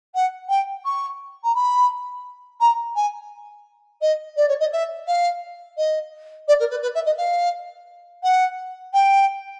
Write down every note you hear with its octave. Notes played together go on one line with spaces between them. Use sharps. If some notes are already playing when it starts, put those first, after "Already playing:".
F#5
G5
C#6
A#5
B5
A#5
G#5
D#5
D5
C#5
D#5
E5
F5
D#5
D5
A#4
B4
B4
E5
D#5
F5
F#5
G5